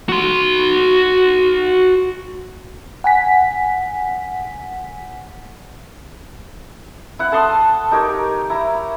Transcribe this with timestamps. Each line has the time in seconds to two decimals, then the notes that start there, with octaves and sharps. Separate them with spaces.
0.09 F#4 C6
3.04 F#5 G#5 B6
7.19 E4 F#5
7.32 A4 A5 C6 D#6
7.91 D#4 G4 A#4 C#5
8.50 E4 A#5